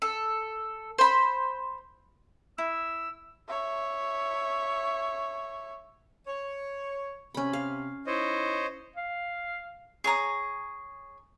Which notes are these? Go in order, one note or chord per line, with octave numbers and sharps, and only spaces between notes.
A4
C5 B5
E4 E6
C#5 E5
C#5
C3 C#4 B5
F5
D#4 E4 C5 C#5 D#5
F5
G#4 C#5 A#5 D#6